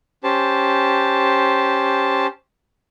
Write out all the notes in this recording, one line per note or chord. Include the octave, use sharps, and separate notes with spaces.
C#4 G4 C5 A5